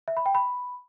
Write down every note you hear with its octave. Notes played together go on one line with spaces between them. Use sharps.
E5
B5
G5
B5